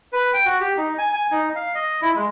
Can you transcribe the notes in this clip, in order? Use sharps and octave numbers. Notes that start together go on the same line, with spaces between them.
B4
G5
F#4
G4
D#4
G#5
G#5
D#4
F5
D#5
E4
G#3